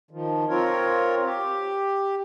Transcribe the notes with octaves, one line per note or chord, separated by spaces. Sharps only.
D#3 F3
C4 F4 A#4 C#5
G4